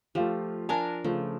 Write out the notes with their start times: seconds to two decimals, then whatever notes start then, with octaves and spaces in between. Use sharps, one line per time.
0.15 F3 A3 F4 G4
0.69 D4 A#4 F5 G#5 A5
1.04 C#3 F3 A3